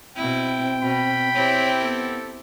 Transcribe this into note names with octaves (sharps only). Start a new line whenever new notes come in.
B2 C4 E4 G5
B2 B5
C4 E4 G4 C#5
B3 A4